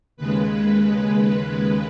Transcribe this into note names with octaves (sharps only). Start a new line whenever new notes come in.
D#2 C#3 G#3 B4
B4